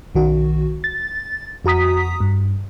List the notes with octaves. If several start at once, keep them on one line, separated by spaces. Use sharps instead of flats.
B1 D#3 F#4
A6
F2 F#4 A#5 D#6 B6
G2